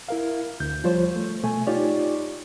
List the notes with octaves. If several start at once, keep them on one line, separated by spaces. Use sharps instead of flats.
E4 A#4 F5
D2 G6
F3 G3 F4 C5 C#5
A3
B2 A3 G#5
D#4 F4 G4 C#5 D5